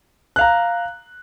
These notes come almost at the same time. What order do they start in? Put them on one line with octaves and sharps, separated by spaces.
F#6 F5 A#5